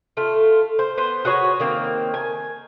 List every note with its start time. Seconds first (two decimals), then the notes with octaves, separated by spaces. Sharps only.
0.17 A3 F4
0.79 C5
0.97 B3 C5
1.25 F#4 G#4 B4 C#5
1.60 D#3 A#3 C4
2.14 G#5